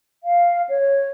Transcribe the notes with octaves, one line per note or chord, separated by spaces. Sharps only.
F5
C#5